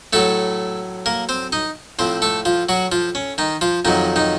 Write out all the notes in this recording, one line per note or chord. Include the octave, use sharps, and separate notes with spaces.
A2 F#3 A3 A4
A#3 A#4
C4 C5
D#4 D#5
A2 F3 C4 C5
A3 A4
F3 F4
F#3 F#4
F3 F4
C#4
D#3 D#4
F3 F4
F2 D#3 F#3 D#4
D#3 D#4